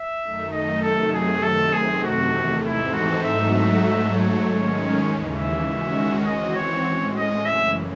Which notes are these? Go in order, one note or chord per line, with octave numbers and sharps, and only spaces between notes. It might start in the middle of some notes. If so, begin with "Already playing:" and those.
Already playing: E5
F#2 D#3 A3 D#4
D#5
C3 D#3 F#3 A3 A4
G#4
F#2 D#3 A3 C4 A4
G#4
E2 C3 D#3 A3 F#4
G#2 E3 C4 D#4 E4 A4
F#4
G#2 F#3 A3 D#4 F#4 E5
E5
G#2 F#3 A3 E5
C#5
D#3 G#3 C#4
D#2 C#3 E3
E5
D#3 G#3 C#4 F#4
E3 C4 F#4 D#5
C#5
A2 G#3 C#4
D#5
F#2 C#3 E3 E5